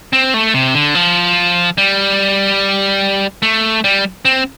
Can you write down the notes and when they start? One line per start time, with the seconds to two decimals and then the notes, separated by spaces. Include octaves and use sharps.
0.13 C4
0.34 A3
0.54 C3
0.75 D3
0.95 F3
1.78 G3
3.42 A3
3.84 G3
4.25 C4